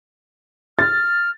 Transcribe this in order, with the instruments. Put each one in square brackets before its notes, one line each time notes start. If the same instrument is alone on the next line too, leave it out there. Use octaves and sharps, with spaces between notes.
[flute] F6 [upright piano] A6